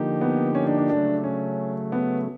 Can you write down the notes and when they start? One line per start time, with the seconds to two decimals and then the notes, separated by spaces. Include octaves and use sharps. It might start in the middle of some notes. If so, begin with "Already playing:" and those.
Already playing: D3 F3 A#3 D#4 G4
0.21 B3
0.55 C#4
0.67 D4
0.78 D4
0.90 C#3 F#3 A3 D4
1.24 C#4
1.92 B3